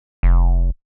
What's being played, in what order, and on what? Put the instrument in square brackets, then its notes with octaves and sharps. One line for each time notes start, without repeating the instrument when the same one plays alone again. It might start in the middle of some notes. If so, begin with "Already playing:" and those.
[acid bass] F1